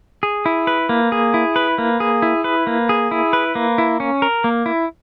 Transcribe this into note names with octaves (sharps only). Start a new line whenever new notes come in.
G#4
E4
B4
A#3
G#4
E4
B4
A#3
G#4
E4
B4
A#3
G#4
E4
B4
A#3
E4
C#4
A#4
A#3
E4